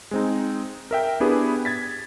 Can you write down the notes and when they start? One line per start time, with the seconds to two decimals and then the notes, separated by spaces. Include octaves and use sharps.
0.11 G#3 C4 D#4
0.91 A#4 E5 G5
1.20 B3 D4 E4 G4 G#4 B4
1.65 G#6 A6 B6